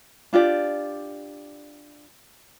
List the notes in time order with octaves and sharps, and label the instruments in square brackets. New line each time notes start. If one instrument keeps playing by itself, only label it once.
[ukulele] D4 F4 G4 D5